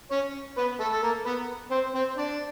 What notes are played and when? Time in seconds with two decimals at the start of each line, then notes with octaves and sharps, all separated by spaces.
0.11 C#4 C#5
0.58 B3 B4
0.80 A3 A4
0.93 A4
1.03 A#3 A#4
1.25 B3 B4
1.71 C4 C5
1.95 C4 C5
2.17 D4 D5